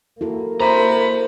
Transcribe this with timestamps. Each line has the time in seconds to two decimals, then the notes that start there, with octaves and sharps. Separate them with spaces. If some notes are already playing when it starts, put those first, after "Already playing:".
0.21 A#3 E4 F#4 A4
0.60 C5 E5 A#5 B5